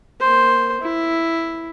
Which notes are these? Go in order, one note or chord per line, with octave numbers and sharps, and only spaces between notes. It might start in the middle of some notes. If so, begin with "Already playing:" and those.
A#3 C5
E4